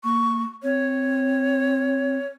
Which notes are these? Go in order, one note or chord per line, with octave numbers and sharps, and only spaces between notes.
A#3 C#6
C4 C#5